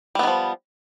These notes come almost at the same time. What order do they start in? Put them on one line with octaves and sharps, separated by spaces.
G3 B3 D#3 F3